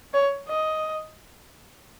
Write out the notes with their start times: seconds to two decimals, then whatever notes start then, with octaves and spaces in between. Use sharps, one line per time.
0.14 C#5
0.49 D#5